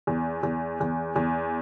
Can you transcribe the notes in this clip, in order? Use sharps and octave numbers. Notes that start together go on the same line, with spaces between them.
E2
E2
E2
E2